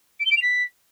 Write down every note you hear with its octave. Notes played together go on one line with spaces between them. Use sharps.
D7
G7
D7
F7
B6